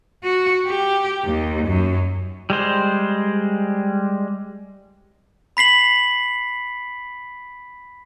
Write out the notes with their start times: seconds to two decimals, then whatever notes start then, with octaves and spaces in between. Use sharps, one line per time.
0.24 F#4
0.66 G4
1.25 D#2
1.67 F#2
2.50 G3 G#3 C5
5.57 B5 B6 C7 F#7